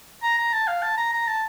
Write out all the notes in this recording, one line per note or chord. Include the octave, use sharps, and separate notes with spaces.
A#5
A#5
A5
F5
A5
A#5
A#5
A5